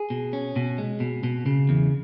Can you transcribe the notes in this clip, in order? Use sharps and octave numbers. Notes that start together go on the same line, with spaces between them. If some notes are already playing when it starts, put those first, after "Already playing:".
Already playing: G#4
B2
C#4
B2
G#3
B2
B2
C#3
E2